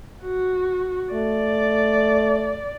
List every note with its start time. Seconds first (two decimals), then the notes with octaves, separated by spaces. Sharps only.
0.22 F#4
1.13 A3 D5